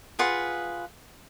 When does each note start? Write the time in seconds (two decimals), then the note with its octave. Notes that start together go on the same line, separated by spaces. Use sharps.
0.19 F4 G#4 B4 F#5